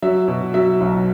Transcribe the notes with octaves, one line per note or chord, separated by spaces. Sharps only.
F#3 E5
B2
F#3 E5
B1